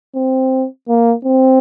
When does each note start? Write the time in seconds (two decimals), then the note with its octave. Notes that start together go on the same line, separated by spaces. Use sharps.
0.15 C4
0.88 A#3
1.25 C4